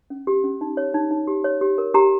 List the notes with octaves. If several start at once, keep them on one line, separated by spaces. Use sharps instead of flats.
C#4
G4
C#4
D#4
C#5
D#4
D#4
G4
C#5
G4
A#4
G4 A#5